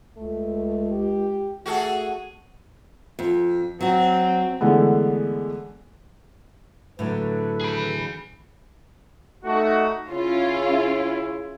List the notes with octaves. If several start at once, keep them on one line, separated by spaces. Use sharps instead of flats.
C#2 A3
G4
A3 F#4 G#4 A4
F2
F#3 C4 F#4
D3 E3 G#3 A3 B3
A2 D3 F#3 A4 B4
G#4 B5
A3 D#4 F#4
C#3 C#4 E4 F4